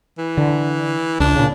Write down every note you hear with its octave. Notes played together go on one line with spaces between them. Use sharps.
E3
D3
C#2 D4
A#2 C#3